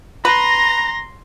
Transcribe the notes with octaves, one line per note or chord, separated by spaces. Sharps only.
B4 A#5 C6 A#6